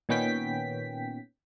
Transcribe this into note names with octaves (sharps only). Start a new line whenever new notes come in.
A#2 D#3 B3 C#4 G5 B6